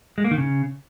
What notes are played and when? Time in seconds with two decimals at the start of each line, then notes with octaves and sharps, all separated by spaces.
0.18 G#3
0.24 A#3
0.31 D#3
0.38 C#3